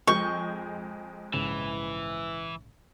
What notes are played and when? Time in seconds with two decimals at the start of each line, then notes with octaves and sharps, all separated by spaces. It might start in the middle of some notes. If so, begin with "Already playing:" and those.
0.07 F2 G#3 C#6 G6
1.34 A#1 G#2 C#3 E3